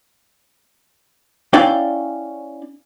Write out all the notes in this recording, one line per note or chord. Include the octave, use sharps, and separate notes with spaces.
C#4 E4 D5 F5 G5